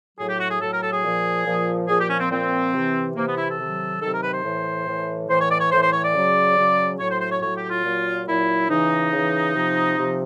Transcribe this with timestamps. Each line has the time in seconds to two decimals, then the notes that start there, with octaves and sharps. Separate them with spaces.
0.17 A2 F#3 G#4
0.28 G4
0.39 F#4
0.50 G#4
0.60 A2 F#3 A4
0.71 A#4
0.81 A4
0.92 G#4
1.03 A#2 F3
1.45 A#2 F3
1.88 A#2 F3 G#4
1.98 G4
2.09 C#4
2.20 C4
2.30 A#2 F3 C4
2.73 C3 E3
3.15 C3 E3 A#3
3.26 B3
3.37 E4
3.48 A4
3.58 C3 D#3 F#3
4.01 C3 D#3 F#3 A4
4.12 A#4
4.22 B4
4.33 C5
4.43 A2 E3
4.86 A2 E3
5.29 A2 E3 C5
5.40 C#5
5.50 D5
5.60 C#5
5.71 A2 E3 C5
5.82 C5
5.92 C#5
6.03 D5
6.14 C#3 F#3
6.57 C#3 F#3
6.99 A2 F#3 C#5
7.09 C5
7.20 C5
7.30 C#5
7.41 A2 F#3 C#5
7.56 G4
7.70 F4
7.84 A#2 F#3
8.27 A#2 F#3 E4
8.69 C#3 E3 D#4
9.12 C#3 E3
9.55 C3 F3
9.97 C3 F3